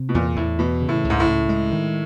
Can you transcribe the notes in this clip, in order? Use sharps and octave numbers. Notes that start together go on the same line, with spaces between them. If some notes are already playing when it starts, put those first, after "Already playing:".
Already playing: C3
B2
E2 A#2
E2 A2
B2 E3
C#3
A2
C#2
G#2
A2
C#2
G#3
D#3